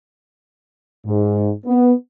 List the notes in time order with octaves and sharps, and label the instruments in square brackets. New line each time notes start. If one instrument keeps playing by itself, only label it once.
[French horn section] G#2
B3